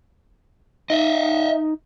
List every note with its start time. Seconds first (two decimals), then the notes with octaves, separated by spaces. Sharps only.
0.90 D#4 D#5 E5